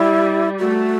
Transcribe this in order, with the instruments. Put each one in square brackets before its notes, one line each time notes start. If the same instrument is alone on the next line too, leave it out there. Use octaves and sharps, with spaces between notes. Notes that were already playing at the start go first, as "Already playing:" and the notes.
Already playing: [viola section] G3 [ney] E4
[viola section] A3 [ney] F#4